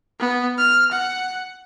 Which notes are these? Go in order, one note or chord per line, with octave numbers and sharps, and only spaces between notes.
B3
F6
F#5